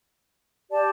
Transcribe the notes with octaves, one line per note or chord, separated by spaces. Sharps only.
G4 D5 A5